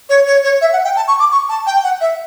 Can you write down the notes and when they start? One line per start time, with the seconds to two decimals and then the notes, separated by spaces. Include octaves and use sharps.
0.09 C#5
0.27 C#5
0.44 C#5
0.61 E5
0.73 F#5
0.84 G5
0.96 A5
1.08 C#6
1.19 D6
1.31 C#6
1.49 A5
1.66 G5
1.84 F#5
2.01 E5